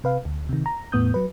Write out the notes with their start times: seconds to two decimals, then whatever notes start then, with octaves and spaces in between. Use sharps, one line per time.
0.04 C3 B4 F5
0.25 D2
0.49 C3 D#3
0.66 A#5
0.92 E2 A2 B3 D#6 G6
1.14 F#3 B4